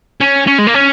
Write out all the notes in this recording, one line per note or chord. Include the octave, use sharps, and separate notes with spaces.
C#4
C#4
G#3
A#3
C#4